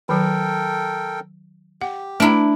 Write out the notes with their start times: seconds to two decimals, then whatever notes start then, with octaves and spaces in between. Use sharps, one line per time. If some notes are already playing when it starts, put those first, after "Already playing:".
0.09 D#3 F#3 A4 A#4 G5
1.81 G4 F#5
2.20 A3 D4 E4 A5 A#5